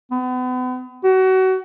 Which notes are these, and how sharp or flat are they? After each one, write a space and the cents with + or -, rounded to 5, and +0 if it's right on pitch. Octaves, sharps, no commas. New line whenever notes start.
B3 +40
F#4 +30